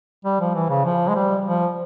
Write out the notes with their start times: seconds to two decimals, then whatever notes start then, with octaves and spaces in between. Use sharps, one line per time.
0.25 G3
0.40 F3
0.55 E3
0.70 C#3
0.84 F3
1.08 G#3
1.15 G3
1.45 F3